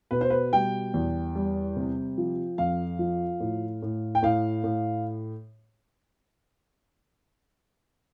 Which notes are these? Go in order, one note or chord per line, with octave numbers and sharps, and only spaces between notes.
B2 B4
C5
B4
G3 G5
E2
G3
C3
F3
F2 F5
F3
A2
A2
G5
A2 F5
A2